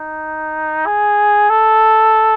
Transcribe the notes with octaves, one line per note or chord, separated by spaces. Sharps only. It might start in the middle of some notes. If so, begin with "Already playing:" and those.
Already playing: D#4
G#4
A4